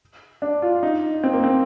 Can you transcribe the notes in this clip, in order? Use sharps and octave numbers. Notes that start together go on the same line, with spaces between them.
D4
F4
D#4
C4
A#3
C4